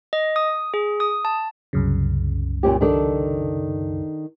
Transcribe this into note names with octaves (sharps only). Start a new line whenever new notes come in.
D#5
D#6
G#4
D#6
A5
C2 F#2 C#3
A#2 C#4 G4
D#3 D4 A4